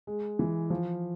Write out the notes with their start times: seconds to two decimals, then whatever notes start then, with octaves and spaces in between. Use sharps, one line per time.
0.07 G#3
0.39 E3
0.70 F3